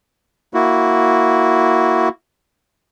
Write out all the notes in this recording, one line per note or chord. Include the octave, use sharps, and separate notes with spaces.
A#3 E4 F#4